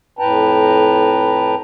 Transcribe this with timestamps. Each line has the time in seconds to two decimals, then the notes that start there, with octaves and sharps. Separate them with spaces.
0.19 F2 A2 B4 G5 A5 A#5